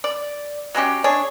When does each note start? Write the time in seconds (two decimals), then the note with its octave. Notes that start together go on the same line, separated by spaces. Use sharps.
0.04 D5
0.75 F#3 G#3 C#4 G4
1.04 D4 G#4 C#5